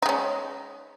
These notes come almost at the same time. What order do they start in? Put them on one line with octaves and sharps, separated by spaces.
D#4 G#3 C#4